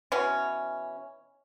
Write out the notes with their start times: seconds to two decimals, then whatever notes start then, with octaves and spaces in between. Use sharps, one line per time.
0.12 B2 E3 C#4